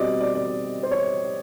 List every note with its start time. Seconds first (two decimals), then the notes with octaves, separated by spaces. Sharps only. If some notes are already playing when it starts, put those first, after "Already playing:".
Already playing: B2 G3 C4 D5 D#5
0.21 D5
0.35 D5
0.83 C5
0.91 C#5